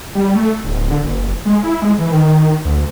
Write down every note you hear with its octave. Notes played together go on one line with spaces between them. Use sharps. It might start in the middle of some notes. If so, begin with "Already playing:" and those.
G3
A3
D1
D3
F#1
G#3
E4
G#3
E3
D#3
D2